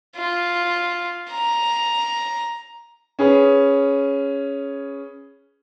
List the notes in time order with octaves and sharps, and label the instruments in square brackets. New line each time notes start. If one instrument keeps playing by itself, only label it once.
[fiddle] F4
A#5
[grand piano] C#4 G#4 B4